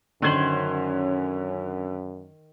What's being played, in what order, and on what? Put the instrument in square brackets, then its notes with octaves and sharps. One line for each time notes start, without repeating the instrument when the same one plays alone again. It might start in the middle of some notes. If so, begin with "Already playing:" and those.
[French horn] F#2 [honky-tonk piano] D3 G#6 F#7 [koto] D#3 C5 [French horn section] C#4